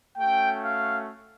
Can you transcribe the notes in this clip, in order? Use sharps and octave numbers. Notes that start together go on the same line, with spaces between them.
A3 C#4 F#4 G5
F5